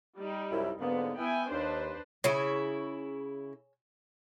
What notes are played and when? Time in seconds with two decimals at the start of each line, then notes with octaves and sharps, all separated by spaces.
0.18 G3 D#4
0.51 C2 F#2 E4
0.80 G#2 D3 A#3 B3
1.17 B3 E4 G5 G#5
1.51 D#2 D4 B4 C5
2.24 C#3 E4 G#4 C#5